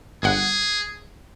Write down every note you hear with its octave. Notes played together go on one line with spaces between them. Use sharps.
G1 G#4 F#5